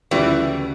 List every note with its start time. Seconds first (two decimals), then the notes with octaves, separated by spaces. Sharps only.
0.11 D2 C#3 E3 F3 G3